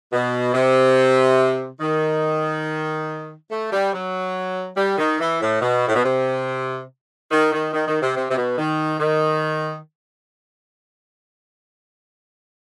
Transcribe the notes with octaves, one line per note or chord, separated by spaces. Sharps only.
B2
C3
D#3
A3
G3
F#3
G3
D#3
E3
A2
B2
A2
B2
C3
D#3
D#3
D#3
D#3
C3
C3
C3
B2
D#3
D#3